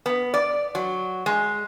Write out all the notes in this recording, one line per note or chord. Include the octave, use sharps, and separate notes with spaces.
B3
D5
F#3
G#3